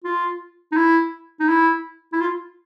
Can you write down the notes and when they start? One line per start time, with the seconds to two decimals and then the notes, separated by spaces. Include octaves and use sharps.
0.04 F4
0.72 D#4
0.77 E4
1.40 D#4
1.49 E4
2.13 E4
2.21 F4